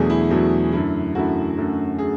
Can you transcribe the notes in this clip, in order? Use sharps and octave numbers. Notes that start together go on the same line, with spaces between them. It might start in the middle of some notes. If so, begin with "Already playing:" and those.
Already playing: E2 B2 F#3 A3 D4 G#4
E4
E2 B2 F#3 A3 D4
F#2 D3 A3 E4
F#2 D3 A3 E4 F#4
F#2 D3 A3 C#4
D3 A3 G#4